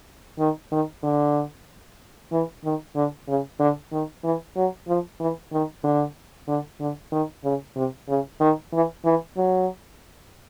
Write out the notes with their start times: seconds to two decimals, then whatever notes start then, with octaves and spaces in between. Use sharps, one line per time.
0.39 D#3
0.72 D#3
1.03 D3
2.32 E3
2.64 D#3
2.96 D3
3.28 C#3
3.60 D3
3.92 D#3
4.24 E3
4.56 F#3
4.88 F3
5.20 E3
5.52 D#3
5.84 D3
6.48 D3
6.80 D3
7.12 D#3
7.44 C#3
7.76 C3
8.08 C#3
8.40 D#3
8.73 E3
9.05 E3
9.37 F#3